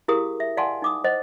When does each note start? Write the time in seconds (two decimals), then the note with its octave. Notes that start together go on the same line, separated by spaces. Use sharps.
0.08 E4 G4 G#4 A#4 F5 D#6
0.40 E5
0.57 D5 F5 F#5 G#5 A5 C6
0.82 D#4 D6 D#6
1.04 C5 D#5 F#5